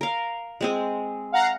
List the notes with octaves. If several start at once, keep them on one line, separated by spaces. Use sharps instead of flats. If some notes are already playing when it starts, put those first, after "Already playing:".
A#4 F5
G#3 C4 G#4
F5 F#5 A#5